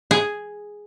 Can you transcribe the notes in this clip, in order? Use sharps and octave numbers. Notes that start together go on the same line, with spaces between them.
G#4